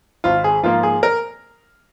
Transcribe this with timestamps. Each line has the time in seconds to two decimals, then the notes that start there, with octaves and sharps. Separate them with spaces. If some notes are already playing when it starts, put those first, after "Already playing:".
0.24 G#1 F4
0.44 G#4
0.63 G#2 F3 A#3 F4
0.83 G#4
1.03 A#4